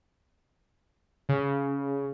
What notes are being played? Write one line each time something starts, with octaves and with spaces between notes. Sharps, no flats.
C#3